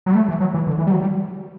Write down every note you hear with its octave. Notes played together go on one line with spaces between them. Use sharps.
F#3
G3
A3
E3
F#3
E3
D3
E3
G3
F#3
G3